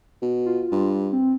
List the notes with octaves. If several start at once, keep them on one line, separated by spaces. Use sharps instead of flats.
B2
F4
G2
C4